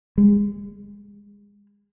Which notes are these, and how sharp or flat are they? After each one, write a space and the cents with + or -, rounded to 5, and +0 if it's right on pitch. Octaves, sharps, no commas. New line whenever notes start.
G#3 -30